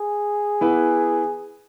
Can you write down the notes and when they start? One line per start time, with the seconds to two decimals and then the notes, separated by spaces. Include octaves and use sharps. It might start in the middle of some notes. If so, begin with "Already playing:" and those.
Already playing: G#4
0.61 E3 B3 E4 B4